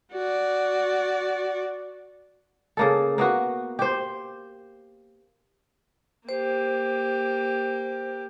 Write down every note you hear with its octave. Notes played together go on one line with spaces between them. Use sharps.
F#4 D5
C#3 A#3 A4
A#3 B3 F#4
G4 C5
A#3 G4 C5